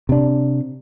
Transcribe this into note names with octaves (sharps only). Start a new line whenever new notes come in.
C3 D4